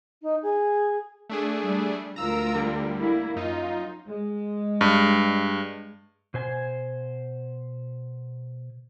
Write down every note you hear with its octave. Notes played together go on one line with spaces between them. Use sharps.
D#4
G#4
A3 D4 G#4
G3
D2 F4 A#4 A#5 E6
D3 G3
A#3 E4
F#2 D#4 F4
G#3
G2
B2 C5 G#5